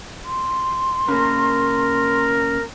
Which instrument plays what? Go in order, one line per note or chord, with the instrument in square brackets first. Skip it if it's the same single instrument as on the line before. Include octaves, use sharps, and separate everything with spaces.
[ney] C6
[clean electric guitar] C#3 A#3 [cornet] A#4